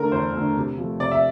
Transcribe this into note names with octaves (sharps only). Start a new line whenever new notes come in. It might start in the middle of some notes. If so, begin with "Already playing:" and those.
Already playing: D3 A3 A#4
E2 C5
D3 A3
C3
F3 A3
C3 D5
E5